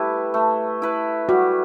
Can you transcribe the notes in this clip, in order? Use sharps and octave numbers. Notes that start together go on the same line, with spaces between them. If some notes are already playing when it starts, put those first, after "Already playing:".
Already playing: A3 E4 G4 B4
A3
E4 B4
G3 F#4